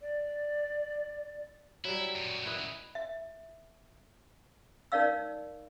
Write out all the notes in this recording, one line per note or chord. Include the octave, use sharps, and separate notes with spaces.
D5
F#3 G3 E4
F#2 A#2
E4 B4 D#5
E5
D#4 A#4 C#5 D5 F5 E6